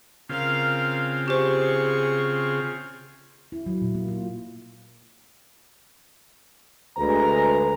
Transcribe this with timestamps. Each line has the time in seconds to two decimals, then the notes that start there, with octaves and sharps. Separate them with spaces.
0.29 C#3 C4 F4 A#4 F5
1.28 G4 G#4 C5 C#6
3.52 E4
3.66 F#3
3.82 A#2
3.95 A#3
4.08 F4
6.97 D2 G#3 B4 A#5